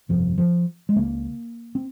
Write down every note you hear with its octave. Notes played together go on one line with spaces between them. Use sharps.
G1 F2 C3 F3
F3
G#3
C#2 C#3 A#3
C4